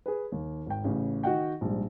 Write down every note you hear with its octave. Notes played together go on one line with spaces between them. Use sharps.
G#4 B4
D#2
G#1 G5
A1 C#3
D#3 F#4 D#5 F#5 G5
A#1 G#2 G3